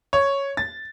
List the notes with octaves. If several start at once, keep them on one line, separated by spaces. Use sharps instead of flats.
C#5
A6